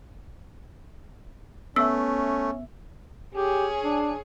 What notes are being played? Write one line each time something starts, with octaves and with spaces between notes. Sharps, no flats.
A3 B3 C#4 E5 E6
C#4 G4 G#4
D4